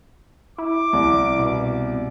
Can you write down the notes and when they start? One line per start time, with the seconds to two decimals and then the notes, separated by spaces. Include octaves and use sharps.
0.58 E4 D6
0.93 C2
1.39 B2